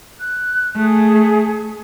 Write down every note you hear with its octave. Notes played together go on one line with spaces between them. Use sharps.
F#6
A3 G#4